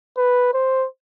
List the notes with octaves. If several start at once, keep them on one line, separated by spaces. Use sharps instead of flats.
B4
C5